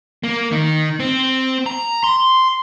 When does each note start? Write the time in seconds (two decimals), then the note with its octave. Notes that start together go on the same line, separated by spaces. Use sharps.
0.24 A#3
0.52 D#3
1.00 C4
1.66 A#5
2.04 C6